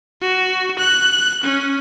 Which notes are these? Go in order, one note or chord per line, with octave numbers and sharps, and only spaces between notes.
F#4
F#6
C#4